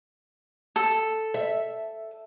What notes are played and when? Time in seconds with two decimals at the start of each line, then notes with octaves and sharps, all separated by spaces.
0.76 A4
1.34 E5